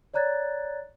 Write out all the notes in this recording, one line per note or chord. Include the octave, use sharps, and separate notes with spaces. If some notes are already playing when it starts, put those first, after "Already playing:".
C#5 D5 A#5 F#6 G#6 A6